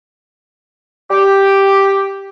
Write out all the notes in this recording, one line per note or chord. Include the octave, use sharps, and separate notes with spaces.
G4